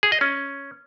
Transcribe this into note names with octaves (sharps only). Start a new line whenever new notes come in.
G#4
D#5
C#4